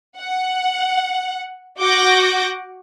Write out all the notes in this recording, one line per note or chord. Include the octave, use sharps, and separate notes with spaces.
F#5
F#4 F#5 D6 G6 A#6